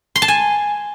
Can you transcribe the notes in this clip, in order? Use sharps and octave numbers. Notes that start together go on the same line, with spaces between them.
C6
A5
G#5